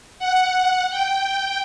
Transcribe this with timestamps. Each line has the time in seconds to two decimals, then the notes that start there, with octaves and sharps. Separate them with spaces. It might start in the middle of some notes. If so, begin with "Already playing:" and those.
0.19 F#5
0.90 G5